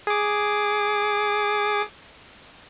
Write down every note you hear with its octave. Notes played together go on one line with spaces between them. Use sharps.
G#4 D6